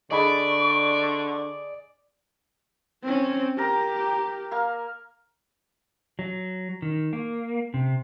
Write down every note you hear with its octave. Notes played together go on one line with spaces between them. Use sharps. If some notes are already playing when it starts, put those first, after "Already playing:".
D3 G#4 D5 D#5 B5 C#6
C4 C#4
G4 A#4 A#5
A#3 F5
F#3
D#3
A#3
C3